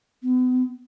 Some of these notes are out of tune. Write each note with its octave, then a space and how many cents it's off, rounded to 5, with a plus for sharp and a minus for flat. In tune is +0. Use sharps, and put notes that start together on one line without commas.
B3 +40